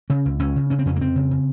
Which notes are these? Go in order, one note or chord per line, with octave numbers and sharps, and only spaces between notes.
C#3 C#4
C#2
C#2 C#4
C#3
C#3 C#4
C4
F2 C#4
A#3
F2 C4
C#3
C#3